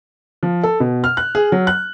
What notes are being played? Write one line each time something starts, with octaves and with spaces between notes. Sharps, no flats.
F3
A4
B2
F6
F#6
G#4
F#3
F#6